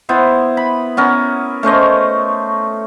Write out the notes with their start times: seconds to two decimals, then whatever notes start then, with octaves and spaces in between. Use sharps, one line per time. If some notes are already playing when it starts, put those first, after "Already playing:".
0.09 B3 E4 C5
0.57 B5
0.97 B3 C#4 A#4
1.63 A3 C#4 C5 D#5